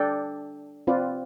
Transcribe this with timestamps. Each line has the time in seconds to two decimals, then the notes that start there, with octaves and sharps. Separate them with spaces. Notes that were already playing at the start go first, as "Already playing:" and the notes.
Already playing: D4 A4 D5 G5
0.87 C4 F4 B4 D5